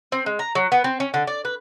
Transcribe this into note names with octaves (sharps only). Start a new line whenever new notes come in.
C4
G#3
A#5
F#3
B3
C4
C#4
D3
D5
B4